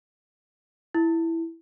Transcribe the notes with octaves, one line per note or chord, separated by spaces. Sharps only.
E4